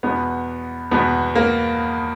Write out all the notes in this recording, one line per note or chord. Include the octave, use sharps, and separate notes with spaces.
E2 B2 B3
E2 B2 B3
A#3